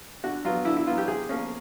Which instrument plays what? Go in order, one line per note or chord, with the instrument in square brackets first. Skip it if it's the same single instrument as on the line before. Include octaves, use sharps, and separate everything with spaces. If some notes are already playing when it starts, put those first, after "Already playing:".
[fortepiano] D3 F#4
F#3 B3 F4
D3 E4
E4
F#3 B3 F4
G4
C3 G#4
F3 A#3 C#4